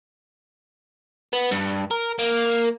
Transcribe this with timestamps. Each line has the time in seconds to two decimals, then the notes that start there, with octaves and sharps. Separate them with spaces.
1.33 B3
1.51 G2
1.91 A#4
2.19 A#3